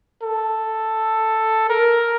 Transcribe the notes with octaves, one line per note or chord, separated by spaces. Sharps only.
A4
A#4